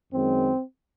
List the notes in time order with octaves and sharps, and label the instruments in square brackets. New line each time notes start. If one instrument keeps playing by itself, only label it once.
[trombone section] F#2 D#3 G#3 C4